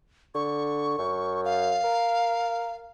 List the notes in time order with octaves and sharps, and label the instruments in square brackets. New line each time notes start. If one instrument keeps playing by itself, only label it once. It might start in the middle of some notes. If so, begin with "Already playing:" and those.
[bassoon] D3 [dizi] C#6
[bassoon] F#2
[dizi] F5
[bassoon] A#4